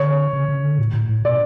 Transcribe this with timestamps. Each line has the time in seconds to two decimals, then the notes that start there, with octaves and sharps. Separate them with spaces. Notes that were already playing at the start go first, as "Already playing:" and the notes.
Already playing: D3 C#5
0.33 C#3
0.48 C#3
0.63 D3
0.78 A2
0.94 A2
1.09 A2
1.25 B2 D5